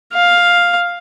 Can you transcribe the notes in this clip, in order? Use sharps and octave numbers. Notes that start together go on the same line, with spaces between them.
F5